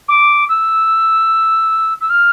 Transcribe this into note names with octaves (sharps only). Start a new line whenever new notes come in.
D6
E6
E6
F6